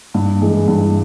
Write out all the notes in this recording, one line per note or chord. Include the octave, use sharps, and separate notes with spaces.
G2
E3 G#3
G2